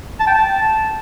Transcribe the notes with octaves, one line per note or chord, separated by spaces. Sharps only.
A5
G5
A5